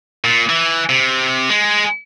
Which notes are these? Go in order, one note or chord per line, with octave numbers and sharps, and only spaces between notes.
A#2
E3
C3
G#3